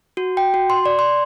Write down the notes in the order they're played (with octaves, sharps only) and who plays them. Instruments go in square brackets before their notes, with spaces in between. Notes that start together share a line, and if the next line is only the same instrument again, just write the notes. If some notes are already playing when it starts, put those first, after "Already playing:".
[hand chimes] F#4
G5
F#4
C6
D5
C6